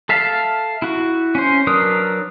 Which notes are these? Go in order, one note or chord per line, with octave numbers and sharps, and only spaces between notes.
A4 E5 F5 A5
E4 F#4
C#4 C5
F#3 D4 A#4 B4 D#6